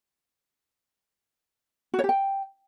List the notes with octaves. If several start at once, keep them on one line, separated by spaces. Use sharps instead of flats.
F#4
C#5
G4
G5